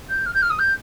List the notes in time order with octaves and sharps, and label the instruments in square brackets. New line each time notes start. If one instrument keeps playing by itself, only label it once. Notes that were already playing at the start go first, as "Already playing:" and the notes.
[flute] G6
F6
G6
F6
D#6
G6